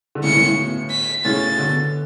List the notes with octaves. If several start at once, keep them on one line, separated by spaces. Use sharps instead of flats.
D3
A2 C#3 C#7
A2
A2
B2
B6
A2 C#3 A6
B2 D3